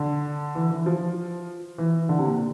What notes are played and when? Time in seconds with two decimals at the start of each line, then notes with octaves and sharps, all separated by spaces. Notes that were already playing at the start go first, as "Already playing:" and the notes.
Already playing: D3
0.55 E3
0.71 E3
0.86 F3
1.78 E3
2.09 D3
2.19 C3
2.25 A#2